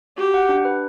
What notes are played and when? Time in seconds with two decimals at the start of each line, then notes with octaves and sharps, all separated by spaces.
0.18 F#4 G4
0.34 F#5
0.49 D4
0.65 B4